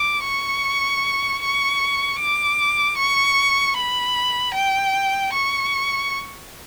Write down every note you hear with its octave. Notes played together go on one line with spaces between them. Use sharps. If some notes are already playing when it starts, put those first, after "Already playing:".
Already playing: D6
C#6
C#6
D6
C#6
B5
G5
C#6